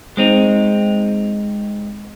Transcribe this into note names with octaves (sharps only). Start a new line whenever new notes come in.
G#3 C4 D#4